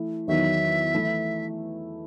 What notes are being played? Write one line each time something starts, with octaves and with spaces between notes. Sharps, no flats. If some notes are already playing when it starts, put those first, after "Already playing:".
Already playing: E3 A3 E4
E2 D#3 F#3 E5
E3 A3 E4